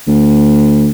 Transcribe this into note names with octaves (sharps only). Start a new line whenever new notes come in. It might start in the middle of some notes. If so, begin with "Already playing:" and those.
D2